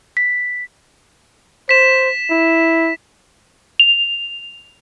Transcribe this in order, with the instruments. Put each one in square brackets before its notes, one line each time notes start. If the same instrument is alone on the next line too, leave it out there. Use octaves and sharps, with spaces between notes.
[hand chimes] B6
[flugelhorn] C5 [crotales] B6 E7
[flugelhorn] E4
[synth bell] F7